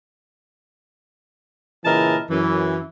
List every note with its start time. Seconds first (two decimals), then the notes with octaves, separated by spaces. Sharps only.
1.85 A#2 C#3 E3 A#4 D#5 A5
2.30 F#2 E3